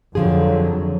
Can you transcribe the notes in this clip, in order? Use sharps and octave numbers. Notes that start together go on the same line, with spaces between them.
F2 D3 F3 F#3 G#4